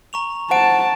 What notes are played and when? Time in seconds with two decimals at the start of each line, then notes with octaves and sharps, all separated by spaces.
0.13 A#5 C#6 F7
0.51 C5 F#5 A5 D7